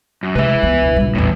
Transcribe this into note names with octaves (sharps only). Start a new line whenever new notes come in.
F#2
C3 G#3 A3 B4 E5
C#2 F3 B3
E1
A#1 G3
A1 E2 A2 E3